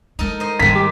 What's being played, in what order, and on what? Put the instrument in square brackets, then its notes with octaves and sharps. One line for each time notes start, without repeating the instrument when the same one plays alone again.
[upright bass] G#3 [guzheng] D#4 A4 A#4
[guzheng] C5 D#5
[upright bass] G#2 G3 [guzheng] D#3 G#3 [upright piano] B6
[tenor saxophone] G4